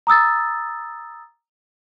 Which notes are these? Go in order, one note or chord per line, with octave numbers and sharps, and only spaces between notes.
A#5 D#6 E6 A6